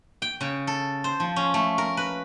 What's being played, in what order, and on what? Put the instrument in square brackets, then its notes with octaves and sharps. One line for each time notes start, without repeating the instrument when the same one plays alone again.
[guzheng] G5
C#3
A4
C5
F3
C#4
A3
A#4
B4